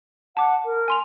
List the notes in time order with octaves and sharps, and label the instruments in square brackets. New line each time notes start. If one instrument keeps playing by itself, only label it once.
[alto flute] F#5 [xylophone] A5 D6
[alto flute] A#4
[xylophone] G#5 C6 F7